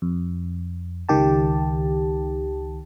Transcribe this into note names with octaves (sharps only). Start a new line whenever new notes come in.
F2
C#2 D#3 G4 A5